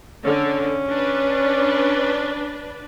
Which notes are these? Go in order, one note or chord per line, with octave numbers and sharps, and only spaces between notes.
D3 C#4
D4 B4